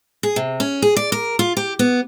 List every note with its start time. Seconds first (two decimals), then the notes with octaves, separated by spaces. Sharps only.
0.23 G#4
0.36 C3
0.60 C#4
0.82 G#4
0.96 D5
1.12 A#4
1.39 F4
1.57 G4
1.79 B3